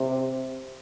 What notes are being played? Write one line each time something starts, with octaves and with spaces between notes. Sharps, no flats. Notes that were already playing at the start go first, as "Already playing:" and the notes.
Already playing: C3